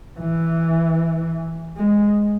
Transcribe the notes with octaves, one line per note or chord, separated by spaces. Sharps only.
E3
G#3